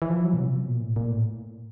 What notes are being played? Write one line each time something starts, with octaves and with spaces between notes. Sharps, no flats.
E3
F3
F#3
B2
C3
B2
A#2
A2
A#2
A2